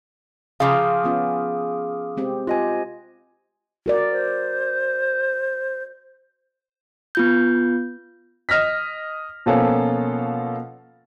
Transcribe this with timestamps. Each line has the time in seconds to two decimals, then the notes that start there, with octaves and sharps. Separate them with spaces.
0.60 C#3 F3 G#4 F5 A#5 D6 D#6
1.04 B3 C#4 F4
2.17 G#3 C4 G4
2.47 F4 G4 C5 D#5 G#5
3.86 F#4 A#4 D5
4.11 C5
7.15 B3 F4 G6
8.49 D#5 F6 A#6 B6
9.46 B2 F3 A#3 C#4 F4 A4